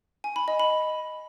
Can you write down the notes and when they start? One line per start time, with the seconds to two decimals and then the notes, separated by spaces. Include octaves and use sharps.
0.24 G#5
0.36 B5
0.48 D#5
0.60 B5